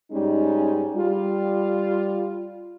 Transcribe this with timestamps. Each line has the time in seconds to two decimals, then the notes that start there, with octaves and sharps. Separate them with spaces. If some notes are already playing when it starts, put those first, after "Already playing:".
0.11 G#2 G3 G#3 C#4 D#4
0.95 G3 F4